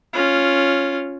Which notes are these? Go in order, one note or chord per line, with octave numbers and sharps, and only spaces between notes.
C#4 F4